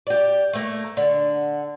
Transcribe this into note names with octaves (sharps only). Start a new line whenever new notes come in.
G4 D5
A3 A#3
D3